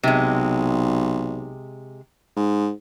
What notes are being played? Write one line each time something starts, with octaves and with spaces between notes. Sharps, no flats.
B1 C3 G#3
G#2